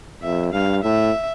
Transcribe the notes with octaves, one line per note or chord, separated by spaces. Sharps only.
F2 E5
G2 F5
A2 E5